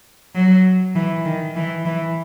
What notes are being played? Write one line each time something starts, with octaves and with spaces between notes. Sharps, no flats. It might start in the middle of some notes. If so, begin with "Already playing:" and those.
F#3
E3
D#3
E3
E3